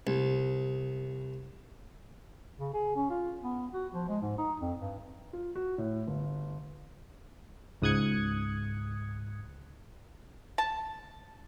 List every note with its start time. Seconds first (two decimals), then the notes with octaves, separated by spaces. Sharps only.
0.07 C2
2.59 C#3
2.74 G#4
2.96 C#4
3.10 F4
3.42 B3
3.74 F#4
3.93 F3
4.08 G#3
4.22 G#2
4.38 D#4
4.60 F2
4.79 G2
5.33 F4
5.55 F#4
5.78 A2
6.07 G1
7.82 C#2 G#2 D#6 F#6 G#6 C#7
10.58 A5